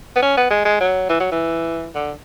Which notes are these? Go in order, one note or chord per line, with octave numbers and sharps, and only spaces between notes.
B3
C#4
B3
G#3
G#3
F#3
E3
F#3
E3
D3